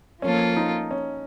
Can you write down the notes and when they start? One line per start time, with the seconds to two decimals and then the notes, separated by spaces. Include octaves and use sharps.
0.22 F3 A#3 C#4 F4 A4
0.56 D#4
0.91 C#4